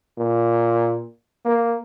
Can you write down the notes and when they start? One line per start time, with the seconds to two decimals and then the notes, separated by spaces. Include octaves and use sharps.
0.18 A#2
1.45 A#3